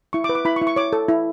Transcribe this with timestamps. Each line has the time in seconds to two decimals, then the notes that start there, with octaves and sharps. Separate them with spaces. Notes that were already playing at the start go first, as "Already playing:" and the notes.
0.13 E4 C#6
0.24 D6
0.29 B4
0.35 D6
0.45 E4 B5
0.56 C#6
0.62 E4
0.67 C#6
0.76 C#5 D6
0.93 A4
1.09 E4